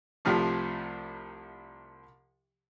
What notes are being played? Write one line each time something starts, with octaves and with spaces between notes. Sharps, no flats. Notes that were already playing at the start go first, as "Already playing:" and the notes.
C2 C3 F3 A3